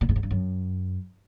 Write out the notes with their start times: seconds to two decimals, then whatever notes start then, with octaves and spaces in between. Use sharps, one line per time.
0.01 A#2
0.09 A2
0.16 G#2
0.23 G2
0.31 F#2